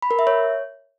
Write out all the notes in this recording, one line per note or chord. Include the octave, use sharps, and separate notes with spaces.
B5
A#4
E5
C#5